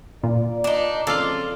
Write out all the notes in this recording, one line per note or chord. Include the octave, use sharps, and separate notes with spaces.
A#2 F4 A#4 D5
D4 D#4
C#3 F3 C4 F4 A4 D5 F5